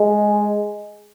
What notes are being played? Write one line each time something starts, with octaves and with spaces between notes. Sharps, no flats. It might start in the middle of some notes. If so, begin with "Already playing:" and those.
Already playing: G#3